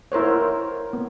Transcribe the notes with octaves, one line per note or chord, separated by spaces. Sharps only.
E4 A#4 C5 C#5
B3